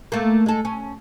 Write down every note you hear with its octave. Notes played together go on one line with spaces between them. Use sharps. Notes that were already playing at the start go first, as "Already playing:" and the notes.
A3 A#3
G#3 A4
C#4